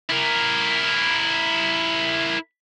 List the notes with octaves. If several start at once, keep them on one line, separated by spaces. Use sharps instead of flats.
E4 A#4